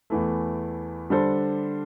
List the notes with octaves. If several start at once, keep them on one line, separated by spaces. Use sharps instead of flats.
E2 E3 A3
D3 G3 D4 A4 C5